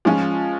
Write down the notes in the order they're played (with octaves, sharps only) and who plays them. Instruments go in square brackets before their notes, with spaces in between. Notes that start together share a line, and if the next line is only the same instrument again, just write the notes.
[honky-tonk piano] F3 G#3 C#4 F4